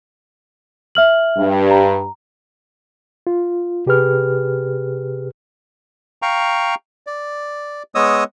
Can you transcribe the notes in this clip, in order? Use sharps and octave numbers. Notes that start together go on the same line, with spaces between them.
E5 F6 F#7
G2
A#5
F4
C3 G4 G#4 B4 F6
F5 G5 A#5 C#6
D5
G#3 B3 C#5 D#5 D#6 E6